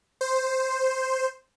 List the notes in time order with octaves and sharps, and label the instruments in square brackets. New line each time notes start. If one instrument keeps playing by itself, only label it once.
[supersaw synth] C5